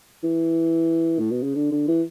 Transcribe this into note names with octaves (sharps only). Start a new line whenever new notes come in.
E3
A2
B2
C#3
D3
D3
E3